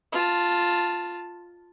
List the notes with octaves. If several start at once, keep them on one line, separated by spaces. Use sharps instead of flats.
F4 A5